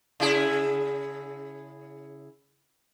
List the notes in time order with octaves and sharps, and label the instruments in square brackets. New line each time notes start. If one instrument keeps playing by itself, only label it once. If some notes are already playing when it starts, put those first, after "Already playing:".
[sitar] C#3 E4 G#4